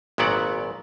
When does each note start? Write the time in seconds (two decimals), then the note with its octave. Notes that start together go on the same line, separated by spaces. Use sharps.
0.18 G#1 A#2 F#3 B3 D5 F#5